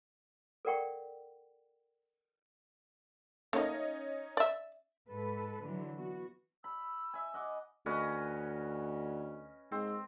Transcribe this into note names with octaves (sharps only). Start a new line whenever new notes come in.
A4 A#4 D5 F#5 G5 C#6
A3 A#3 C#4 D#4 D#5
D5 E5
G#2 A4 B4
D3 E3 F#3
B3 F#4
B5 E6
E5 G#5
D#5 F#5 D6
D2 C#4 B4 D#5
G#2 C4